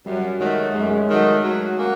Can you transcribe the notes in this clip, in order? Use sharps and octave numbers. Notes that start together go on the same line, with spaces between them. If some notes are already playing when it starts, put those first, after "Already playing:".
F#2 G3
D#3 F#3 G#3 A3
F#2 G#3
A3
G#3
D#3 F#3 A3
F#3
A#3 C#4 F#4